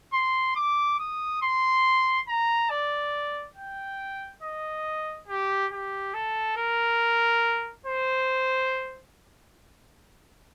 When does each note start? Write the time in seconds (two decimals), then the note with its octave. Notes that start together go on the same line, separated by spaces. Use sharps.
0.13 C6
0.56 D6
0.99 D#6
1.42 C6
2.28 A#5
2.70 D5
3.56 G5
4.42 D#5
5.28 G4
5.72 G4
6.14 A4
6.57 A#4
7.86 C5